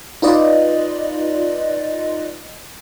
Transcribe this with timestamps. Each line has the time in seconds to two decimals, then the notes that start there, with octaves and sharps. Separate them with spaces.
0.22 D#4 F4 B4 D5 D#5